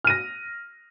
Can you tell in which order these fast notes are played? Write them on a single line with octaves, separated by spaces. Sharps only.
F6 D#7 A#6